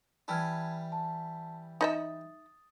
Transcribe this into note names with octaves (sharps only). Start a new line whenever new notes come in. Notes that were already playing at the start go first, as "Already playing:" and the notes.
E3 G3 E4 A5 F6 G#6
A5
D#4 D#5 E5 D#6 A6